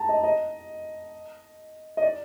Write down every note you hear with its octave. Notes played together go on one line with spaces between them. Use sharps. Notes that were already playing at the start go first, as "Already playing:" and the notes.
Already playing: A5 A#5
D#5
D#5
D#5
D5